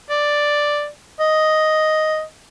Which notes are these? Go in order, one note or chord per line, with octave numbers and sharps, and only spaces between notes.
D5
D#5